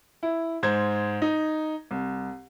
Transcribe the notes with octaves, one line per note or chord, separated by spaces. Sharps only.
E4
G#2 C5 G#6
D#4
C2